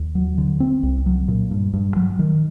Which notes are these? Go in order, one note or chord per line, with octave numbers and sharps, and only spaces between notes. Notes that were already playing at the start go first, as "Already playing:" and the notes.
Already playing: D#2
F#3
D3
C4
C2
F#3
A#2
G2
G2
F#3
D#3